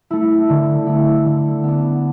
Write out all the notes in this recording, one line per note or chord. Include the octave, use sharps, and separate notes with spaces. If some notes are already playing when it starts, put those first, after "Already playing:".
A3 E4
D3
A3 E4
D3
B3 D4